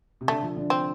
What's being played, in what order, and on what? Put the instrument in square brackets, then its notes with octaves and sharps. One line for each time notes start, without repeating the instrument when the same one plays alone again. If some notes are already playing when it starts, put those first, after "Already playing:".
[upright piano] C3
[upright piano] D3 [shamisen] A3
[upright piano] F3
D3
[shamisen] C4